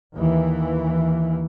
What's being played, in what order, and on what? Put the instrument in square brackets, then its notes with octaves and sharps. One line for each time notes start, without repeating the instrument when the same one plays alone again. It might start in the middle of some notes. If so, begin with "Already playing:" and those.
[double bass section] D#2 E3